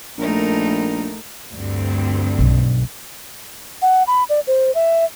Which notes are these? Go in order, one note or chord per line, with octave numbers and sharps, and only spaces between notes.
A#1 A3 D#4 A#4
D2 G2 C4
B1
F#5
B5
D5
C5
E5